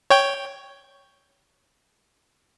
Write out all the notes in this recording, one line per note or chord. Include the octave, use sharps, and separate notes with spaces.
C#5 G5 G6